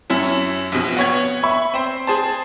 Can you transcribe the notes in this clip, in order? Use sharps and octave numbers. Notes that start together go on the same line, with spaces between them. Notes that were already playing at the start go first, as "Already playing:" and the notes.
F#2 C#4 E4
A#1 B2
B3 C#5 G#6
E5 B5 C#6
C4 C5
G#4 C5 A5